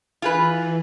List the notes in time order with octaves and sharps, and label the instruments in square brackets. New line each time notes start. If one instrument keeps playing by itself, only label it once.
[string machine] E3 [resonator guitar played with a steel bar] F4 G#4 B4